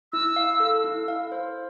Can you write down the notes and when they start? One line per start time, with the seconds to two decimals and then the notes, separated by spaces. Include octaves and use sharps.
0.12 E4 E6
0.36 F5
0.60 A4
0.84 E4
1.08 F5
1.32 C5